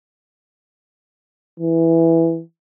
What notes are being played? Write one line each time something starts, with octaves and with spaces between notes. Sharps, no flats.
E3